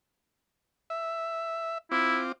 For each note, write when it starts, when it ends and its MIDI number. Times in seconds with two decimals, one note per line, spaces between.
0.90 1.78 76
1.91 2.32 60
1.91 2.20 64
1.91 2.32 65
1.91 2.32 86